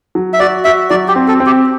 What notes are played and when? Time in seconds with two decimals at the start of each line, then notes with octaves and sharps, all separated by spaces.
0.15 F#3
0.33 E5
0.39 F#4 D5
0.64 F#4 E5
0.90 F#3 D5
1.08 G4
1.15 C4
1.28 A4
1.40 C4
1.46 G4